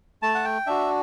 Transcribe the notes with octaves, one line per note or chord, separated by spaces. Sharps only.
A3 A5
F#5
G5
D4 F#4 E5